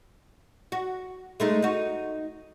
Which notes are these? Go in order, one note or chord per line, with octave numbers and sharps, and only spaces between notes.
F#4
G#3 A3 D#4
D#4 F#4